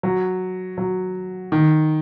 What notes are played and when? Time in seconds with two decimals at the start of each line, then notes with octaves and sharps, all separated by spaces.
0.03 F#3
0.78 F#3
1.52 D#3